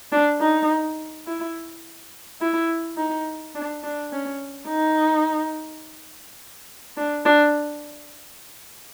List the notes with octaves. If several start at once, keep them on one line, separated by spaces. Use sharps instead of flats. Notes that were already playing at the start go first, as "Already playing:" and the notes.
D4
D#4
E4
E4
D#4
D4
D4
C#4
D#4
D4
D4